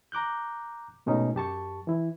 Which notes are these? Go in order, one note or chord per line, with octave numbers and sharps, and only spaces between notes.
A#5 D6 F#6 G6
G#2 B2 A3 C#4 D#4
F#2 G4 A5 C#6
E3 E4